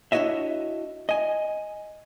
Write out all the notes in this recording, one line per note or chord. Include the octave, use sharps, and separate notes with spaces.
D4 E4 F#4 C#5 D#5 E5
D#5 G#5